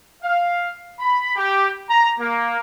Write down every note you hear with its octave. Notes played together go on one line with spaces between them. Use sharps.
F5
B5
G4
A#5
A#3